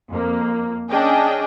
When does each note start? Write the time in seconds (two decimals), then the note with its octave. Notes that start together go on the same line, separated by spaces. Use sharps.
0.11 F2 A#3
0.90 C#4 D4 G#4 D#5 G5